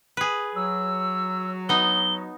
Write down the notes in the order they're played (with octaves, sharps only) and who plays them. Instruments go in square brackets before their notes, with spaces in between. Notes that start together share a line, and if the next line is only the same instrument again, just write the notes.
[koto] G#4 B4
[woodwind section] F#3 [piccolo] E6
[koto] B3 D#4 [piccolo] G7